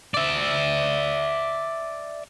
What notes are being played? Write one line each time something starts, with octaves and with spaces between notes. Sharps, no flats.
D5 E5